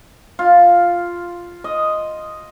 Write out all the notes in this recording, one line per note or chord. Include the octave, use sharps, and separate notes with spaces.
F4
D#5